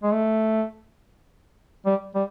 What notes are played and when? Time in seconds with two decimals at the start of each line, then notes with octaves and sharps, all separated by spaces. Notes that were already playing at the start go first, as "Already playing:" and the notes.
0.03 G#3
0.12 A3
1.86 G3
2.15 G3